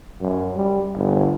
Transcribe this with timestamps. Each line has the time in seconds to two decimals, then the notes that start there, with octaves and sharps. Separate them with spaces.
0.21 F#2
0.56 G3
0.96 G1